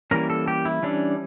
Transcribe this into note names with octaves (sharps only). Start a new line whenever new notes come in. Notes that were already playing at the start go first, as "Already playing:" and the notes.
E3 G3 A#3 C#4 A#4
A4
G4
E4
E3 G3 C#4 D4